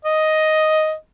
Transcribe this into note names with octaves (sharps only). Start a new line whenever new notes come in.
D#5